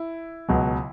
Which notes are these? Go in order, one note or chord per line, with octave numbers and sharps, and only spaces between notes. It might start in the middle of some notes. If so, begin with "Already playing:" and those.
Already playing: E4
C#2 B2 F#3